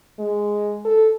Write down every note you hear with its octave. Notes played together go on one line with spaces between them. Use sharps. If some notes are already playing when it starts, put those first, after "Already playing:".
G#3
A4